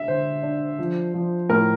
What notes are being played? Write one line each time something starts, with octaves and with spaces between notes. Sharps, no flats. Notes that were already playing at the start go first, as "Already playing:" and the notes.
Already playing: D4 E5
D3 C5
D4
F3
F3
A2 A#4